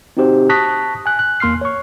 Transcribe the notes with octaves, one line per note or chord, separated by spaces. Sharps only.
C4 D#4 F#4 G4 C5
A5 C#6 D#6 F#6 A#6 B6
G#5 F#6
F#6
E2 A#3 C6 F6 C7
C#5 C#6